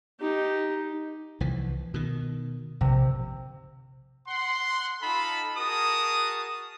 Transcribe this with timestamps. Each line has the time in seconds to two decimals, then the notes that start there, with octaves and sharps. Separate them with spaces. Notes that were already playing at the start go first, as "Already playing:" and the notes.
0.20 D#4 G4
1.40 C2 E3 F3
1.94 B2 D#3
2.81 A#1 C3
4.27 F#5 C6
5.02 D#4 F4 A4 A5 B5
5.58 F#4 G#4 A#4 A5 D#6